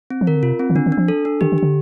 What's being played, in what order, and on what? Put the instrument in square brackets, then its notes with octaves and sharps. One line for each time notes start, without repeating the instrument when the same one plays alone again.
[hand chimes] C4
[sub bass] F3
[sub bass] D#3 [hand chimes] A#4
[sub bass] D3
[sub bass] C3 [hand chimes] F4
[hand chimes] C4
[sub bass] D#3
[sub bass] D3 [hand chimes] D4
[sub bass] D#3
[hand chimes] D4
[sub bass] F3
[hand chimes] A4
D4
[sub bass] D#3 [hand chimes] G4
[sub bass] D#3
[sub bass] D3 [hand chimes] G4